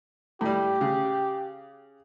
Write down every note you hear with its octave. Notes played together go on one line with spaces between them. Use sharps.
A2 G3 G4
C#3